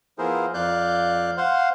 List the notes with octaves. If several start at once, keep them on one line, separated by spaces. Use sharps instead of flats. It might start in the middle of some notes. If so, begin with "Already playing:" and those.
F3 B3 E4 G#4 A#4 C5
F2 D5 F5 F#6 G6
C5 F5 F#5 C6